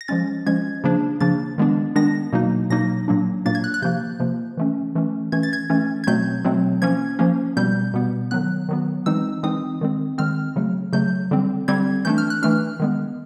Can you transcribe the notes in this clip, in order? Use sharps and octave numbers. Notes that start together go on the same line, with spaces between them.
A#6
F3 G#3 C#4 A6
F3 G#3 C#4 G#6
C#3 F3 A#3 D4
C#3 F3 A#3 D4 A6
D#3 G#3 B3 D4
D#3 G#3 B3 D4 A#6
B2 F#3 A#3 D#4
B2 F#3 A#3 D#4 A#6
A#2 F#3 A#3 D4
A#2 F#3 A#3 D4 A6
G#6
F#6
F#6
C3 F3 A#3 G6
C3 F3 A#3
E3 A3 C#4
E3 A3 C#4
E3 A3 C#4 G#6
A6
G#6
E3 A3 C#4
G#6
B2 F#3 A3 C4 G6
B2 F#3 A3 C4
F3 A#3 C#4 G#6
F3 A#3 C#4
B2 G3 B3 G6
B2 G3 B3
D#3 F#3 B3 F#6
D#3 F#3 B3
E3 G#3 C4 D#4 E6
E3 G#3 C4 D#4 D#6
D#3 G#3 C4
D#3 G#3 C4 F6
C#3 F#3 A3
C#3 F#3 A3 G6
D3 G3 C4
D3 G3 C4 G#6
E3 A3 D4 G6
F6
F#6
E3 A3 D4 F6
D#3 G#3 B3